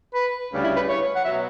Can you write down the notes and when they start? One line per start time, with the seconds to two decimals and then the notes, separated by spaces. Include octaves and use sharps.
0.14 B4
0.52 D2 C#3 G3
0.64 E4
0.76 B4
0.89 C#5
1.15 F#5
1.25 B2 F#3 E5